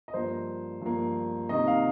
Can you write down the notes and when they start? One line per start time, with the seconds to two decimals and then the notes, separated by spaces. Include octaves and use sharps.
0.08 D#5
0.14 G2 F3 A#3 C5
0.82 G2 F3 A#3
1.49 C3 D#3 A#3 D#5
1.67 F5